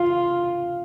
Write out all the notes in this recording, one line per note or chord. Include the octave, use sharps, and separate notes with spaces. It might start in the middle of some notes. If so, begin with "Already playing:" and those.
Already playing: F4 F5